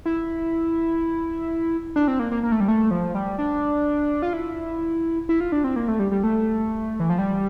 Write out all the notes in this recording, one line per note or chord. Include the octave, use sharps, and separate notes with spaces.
E4
D4
C4
A#3
A#3
A#3
A3
G3
A3
F3
G3
D4
F4
E4
E4
F4
D4
C4
A#3
A3
G3
G3
A3
E3
F3
G3